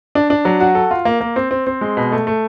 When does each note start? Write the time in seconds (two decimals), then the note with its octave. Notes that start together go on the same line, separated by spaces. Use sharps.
0.15 D4
0.30 D4
0.45 F#3
0.60 F#4
0.75 A4
0.91 F4
1.05 A#3
1.21 A#3
1.36 C4
1.51 C4
1.67 C4
1.81 G#3
1.97 B2
2.12 A3
2.27 A3